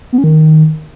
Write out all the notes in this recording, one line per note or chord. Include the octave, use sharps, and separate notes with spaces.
B3
C#4
D#3